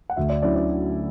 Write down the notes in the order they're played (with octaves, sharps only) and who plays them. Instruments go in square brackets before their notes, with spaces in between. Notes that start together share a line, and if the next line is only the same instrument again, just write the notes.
[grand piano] F#5
D2 E5
D5
D3 F#3 C#4 E4 D5
D5